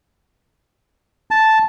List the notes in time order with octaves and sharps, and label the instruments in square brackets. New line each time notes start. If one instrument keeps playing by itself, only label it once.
[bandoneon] A5